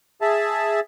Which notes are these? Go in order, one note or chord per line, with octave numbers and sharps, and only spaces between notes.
G#4 E5 A5